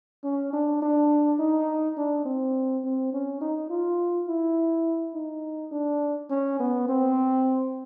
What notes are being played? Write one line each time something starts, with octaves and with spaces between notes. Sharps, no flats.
C#4
D4
D4
D#4
D4
C4
C4
C#4
D#4
F4
E4
D#4
D4
C#4
B3
C4